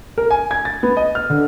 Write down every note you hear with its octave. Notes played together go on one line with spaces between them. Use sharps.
A#4
G#5
G#6
A6
B3
D#5
F6
D3